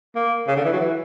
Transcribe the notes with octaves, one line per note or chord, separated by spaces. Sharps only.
A#3
C#3
D3
E3
F#3
E3